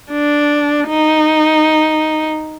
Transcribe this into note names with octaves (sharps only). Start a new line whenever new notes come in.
D4
D#4